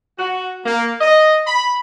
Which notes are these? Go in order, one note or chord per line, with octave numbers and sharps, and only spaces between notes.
F#4
A#3
D#5
B5